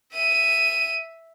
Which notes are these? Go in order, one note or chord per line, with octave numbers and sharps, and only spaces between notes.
E5 D#7